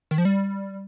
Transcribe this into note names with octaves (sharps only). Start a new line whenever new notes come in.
D#3
F3
G3